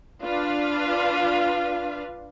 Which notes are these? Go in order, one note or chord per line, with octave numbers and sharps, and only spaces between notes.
D4 F4 B4 F5